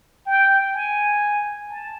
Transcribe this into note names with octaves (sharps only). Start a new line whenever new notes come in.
G5
G#5
A5